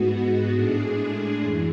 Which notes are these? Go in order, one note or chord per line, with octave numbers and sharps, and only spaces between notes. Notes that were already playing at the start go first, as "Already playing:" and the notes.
Already playing: G#2 G#3 B3 F#4
A2 G#3 D4 G#4
F#2 E3